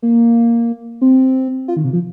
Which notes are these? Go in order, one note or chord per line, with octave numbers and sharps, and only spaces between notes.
A#3
C4
F4
D#3
C3
F3